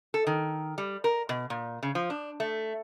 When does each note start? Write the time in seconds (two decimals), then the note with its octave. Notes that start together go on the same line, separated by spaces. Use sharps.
0.14 A4
0.27 D#3
0.78 G3
1.04 A#4
1.29 B2
1.50 A#2
1.83 C#3
1.95 F3
2.10 D4
2.40 A3